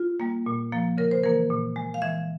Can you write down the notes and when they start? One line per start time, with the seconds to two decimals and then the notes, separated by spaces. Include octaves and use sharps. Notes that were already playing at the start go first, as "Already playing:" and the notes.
Already playing: F4
0.20 G3 A#3
0.46 A#2
0.72 F3 A#3
0.98 C#3 A#4
1.11 C5
1.24 E3 A#3 A#4
1.50 A#2
1.76 G#3
1.94 F5
2.02 E3 E5